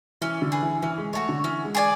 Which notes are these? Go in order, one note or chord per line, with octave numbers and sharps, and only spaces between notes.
E3 C#4
D3
G#4 B4
E3
E3 C#4
G#3
A3 F#4 A4 C#5
D3
E3 C#4
G#3
G#4 D5 G#5